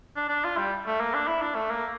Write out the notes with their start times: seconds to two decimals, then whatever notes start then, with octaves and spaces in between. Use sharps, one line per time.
0.16 D4
0.29 D4
0.44 F4
0.57 G3
0.86 A3
1.00 A#3
1.14 D4
1.28 E4
1.42 D4
1.55 A3
1.70 A#3